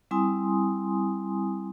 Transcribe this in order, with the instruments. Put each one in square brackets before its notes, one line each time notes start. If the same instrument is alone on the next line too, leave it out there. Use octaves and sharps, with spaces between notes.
[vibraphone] G3 C4 E4 G#5 C6 D#6